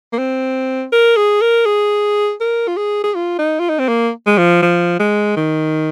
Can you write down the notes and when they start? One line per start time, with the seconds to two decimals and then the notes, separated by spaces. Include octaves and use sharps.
0.13 A#3
0.18 C4
0.92 A#4
1.17 G#4
1.41 A#4
1.66 G#4
2.41 A#4
2.68 F4
2.77 G#4
3.04 G#4
3.15 F4
3.39 D#4
3.60 F4
3.70 D#4
3.79 C4
3.88 A#3
4.27 G#3
4.38 F3
4.62 F3
5.00 G#3
5.37 D#3